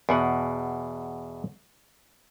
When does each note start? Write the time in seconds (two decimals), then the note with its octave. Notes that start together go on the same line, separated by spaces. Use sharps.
0.09 E2 B2 F#5